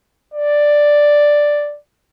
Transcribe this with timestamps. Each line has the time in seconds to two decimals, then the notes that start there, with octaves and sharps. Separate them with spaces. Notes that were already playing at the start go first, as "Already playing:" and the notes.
0.34 D5